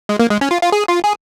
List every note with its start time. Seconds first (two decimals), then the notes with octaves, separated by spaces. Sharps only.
0.09 G#3
0.19 A#3
0.30 G#3
0.41 C#4
0.51 F4
0.62 F4
0.72 G#4
0.88 F4
1.04 G#4